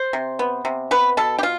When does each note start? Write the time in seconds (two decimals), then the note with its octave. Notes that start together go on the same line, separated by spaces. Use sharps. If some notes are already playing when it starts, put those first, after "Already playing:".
Already playing: C5
0.13 C3
0.39 B3
0.65 C3
0.91 B3 B4
1.17 B2 A4
1.39 G4
1.43 F4